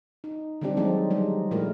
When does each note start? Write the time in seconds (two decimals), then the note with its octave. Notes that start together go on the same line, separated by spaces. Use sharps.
0.24 D#4
0.61 D3 D#3 G3 C4 D4 G4
0.77 F3 F#3 G#3 C4 D#4
1.10 G3 G#3 D#4
1.51 A#2 F3 A3 E4 A#4